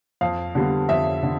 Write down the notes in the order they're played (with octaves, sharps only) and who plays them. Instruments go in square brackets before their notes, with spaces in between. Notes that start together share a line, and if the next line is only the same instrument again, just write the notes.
[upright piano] F2 F5
D3 G3 B3
F2 E5
D3